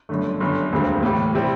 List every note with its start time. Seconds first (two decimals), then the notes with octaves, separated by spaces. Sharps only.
0.09 G1 F#2 D3 A3
0.40 G1 F#2 D3
0.72 E1 D2 D3 G3 C4
1.03 A2 E3 G3
1.34 C3 G3 C4 E4